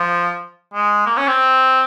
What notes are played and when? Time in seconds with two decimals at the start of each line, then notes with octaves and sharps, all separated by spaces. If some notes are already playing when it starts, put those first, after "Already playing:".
Already playing: F3
0.74 G#3
1.06 A#3
1.18 C#4
1.28 C4